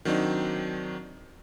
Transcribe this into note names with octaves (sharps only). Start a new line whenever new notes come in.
D#3 F#3 C4 D4 D#4